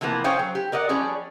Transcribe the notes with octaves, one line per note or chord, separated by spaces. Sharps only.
C3 E3 F3 A#3 B3
C#4 G#4 C5 C#5 F5 G5
F#3
G4
A#4 D5 D#5 F#5
F3 G3 B3 C#4 G#4 D5